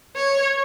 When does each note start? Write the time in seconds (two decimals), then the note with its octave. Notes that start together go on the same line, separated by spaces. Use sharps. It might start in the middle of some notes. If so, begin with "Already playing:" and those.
0.16 C#5